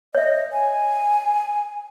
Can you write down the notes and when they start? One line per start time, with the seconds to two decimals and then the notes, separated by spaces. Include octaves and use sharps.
0.15 C#5 D#5 E5
0.52 G#5